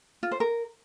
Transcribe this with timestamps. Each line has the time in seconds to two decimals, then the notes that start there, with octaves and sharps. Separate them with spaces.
0.23 F4
0.31 C5
0.40 A#4